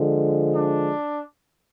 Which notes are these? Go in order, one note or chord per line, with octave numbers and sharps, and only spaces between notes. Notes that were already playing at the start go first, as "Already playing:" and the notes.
Already playing: D3 F3 G#3
D4